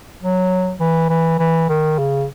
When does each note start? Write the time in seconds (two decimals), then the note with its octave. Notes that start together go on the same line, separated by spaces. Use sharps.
0.22 F#3
0.80 E3
1.09 E3
1.39 E3
1.69 D#3
1.98 C#3